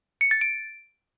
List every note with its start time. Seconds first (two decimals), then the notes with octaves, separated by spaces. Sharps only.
0.21 C#7
0.31 A6
0.41 D7